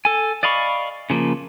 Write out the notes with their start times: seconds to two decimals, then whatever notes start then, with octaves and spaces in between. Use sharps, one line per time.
0.05 A4 G#5
0.43 D5 D#5 F5 B5 C#6
1.10 C#3 F3 A#3